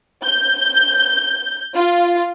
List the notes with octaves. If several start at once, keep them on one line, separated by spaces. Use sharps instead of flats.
G6
F4